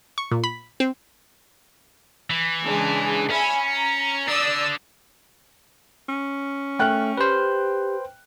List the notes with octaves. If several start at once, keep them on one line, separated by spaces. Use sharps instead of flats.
C#6
A#2
B5
C4
E3
C#3 G#3 D4
C#4 E5 G#5 B5
A#5
D3 D5 D#6 E6
C#4
A3 G5 F6 F#6
G4 B4 C5